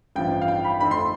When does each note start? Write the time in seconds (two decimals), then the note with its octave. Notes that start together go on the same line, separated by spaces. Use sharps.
0.16 A1 G2 F3 G5
0.41 F5
0.48 G5
0.64 B5
0.81 F2 D3 A3 C4 B5
0.91 C6